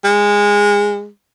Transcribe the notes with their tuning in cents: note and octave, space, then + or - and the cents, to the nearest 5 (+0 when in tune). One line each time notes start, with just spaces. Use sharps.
G#3 -20